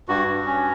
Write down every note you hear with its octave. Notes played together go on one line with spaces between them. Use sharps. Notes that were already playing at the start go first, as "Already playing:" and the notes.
G2 F#4
G2
C#4